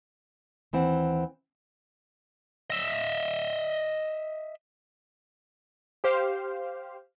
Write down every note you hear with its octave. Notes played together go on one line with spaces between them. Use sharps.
D#2 E3 C4 F#5
D#5 E5
G4 C5 F5